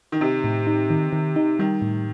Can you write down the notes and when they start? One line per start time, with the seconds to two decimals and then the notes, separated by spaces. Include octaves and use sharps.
0.12 D#3
0.21 C3 D#4
0.44 A2
0.67 D#4
0.90 D#3
1.13 D#3
1.36 D#4
1.59 D#3 G3
1.82 A2